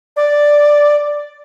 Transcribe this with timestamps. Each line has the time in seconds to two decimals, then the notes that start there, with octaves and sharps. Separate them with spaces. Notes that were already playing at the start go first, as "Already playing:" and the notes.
0.17 D5